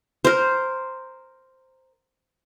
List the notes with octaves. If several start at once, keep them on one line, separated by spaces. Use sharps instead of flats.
A#4 C5